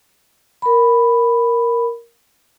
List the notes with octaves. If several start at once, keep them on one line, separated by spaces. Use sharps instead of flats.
A#4 B5